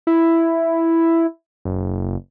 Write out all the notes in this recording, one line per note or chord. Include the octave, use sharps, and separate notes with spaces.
E4
F#1